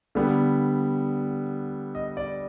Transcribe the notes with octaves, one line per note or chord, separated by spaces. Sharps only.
D3 G3 B3
D#5
D5